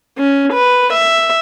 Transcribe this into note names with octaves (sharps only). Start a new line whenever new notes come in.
C#4
B4
E5